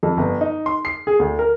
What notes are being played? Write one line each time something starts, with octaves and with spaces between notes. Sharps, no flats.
F2
G1
D#4
C6
C7
G#4
D2
A#4